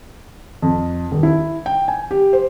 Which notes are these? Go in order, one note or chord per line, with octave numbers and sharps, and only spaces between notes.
F2
D#1
E4
G5
G#5
G4
C5